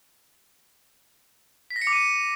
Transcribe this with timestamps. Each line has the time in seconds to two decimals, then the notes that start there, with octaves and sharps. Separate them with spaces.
1.70 B6
1.76 A#6
1.82 C#7
1.87 D6
1.93 D#7